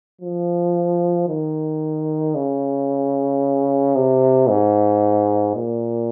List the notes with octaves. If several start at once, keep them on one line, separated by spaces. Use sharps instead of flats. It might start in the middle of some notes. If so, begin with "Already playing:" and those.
F3
D#3
C#3
C3
G#2
A#2